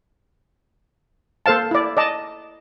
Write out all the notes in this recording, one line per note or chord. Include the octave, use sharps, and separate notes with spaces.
A#3 A4 C5 F5 A5
E4 D5
D5 D#5 A5